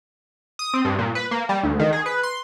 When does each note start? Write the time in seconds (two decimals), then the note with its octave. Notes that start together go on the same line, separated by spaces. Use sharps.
0.59 D#6
0.74 C4
0.85 G2
0.99 A#2
1.15 B4
1.31 A#3
1.49 G3
1.63 D2
1.79 D#3
1.93 G#4
2.06 B4
2.23 C6